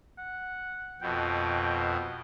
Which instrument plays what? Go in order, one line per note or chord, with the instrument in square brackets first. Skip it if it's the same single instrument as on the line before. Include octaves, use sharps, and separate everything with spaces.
[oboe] F#5
[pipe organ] F2 B2 [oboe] G5